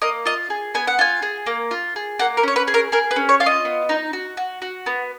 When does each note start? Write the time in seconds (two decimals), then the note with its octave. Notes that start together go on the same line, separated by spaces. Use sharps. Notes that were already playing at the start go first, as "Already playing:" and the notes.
0.02 A#3 D#5
0.26 F4 D#5
0.50 G#4
0.74 B3 G#5
0.87 F#5
0.99 F4 G#5
1.22 G#4
1.46 A#3
1.71 F4
1.96 G#4
2.19 A#3 F#5
2.37 A#4
2.43 C#4 C#5
2.56 B4
2.68 G#4
2.74 A#4
2.92 G#4 A#4
3.11 B4
3.16 C#4
3.29 C#5
3.40 F4 F5
3.46 D#5
3.65 B3
3.89 D#4
4.13 F#4
4.37 F#4
4.62 F#4
4.86 B3